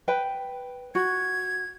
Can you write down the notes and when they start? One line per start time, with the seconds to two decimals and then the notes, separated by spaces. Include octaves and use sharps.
0.08 B4 G5 B5
0.95 F#4 G#6